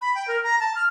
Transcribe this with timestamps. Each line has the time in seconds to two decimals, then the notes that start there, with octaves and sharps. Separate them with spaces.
0.02 B5
0.15 G5
0.28 A#4
0.43 A#5
0.60 A5
0.75 F6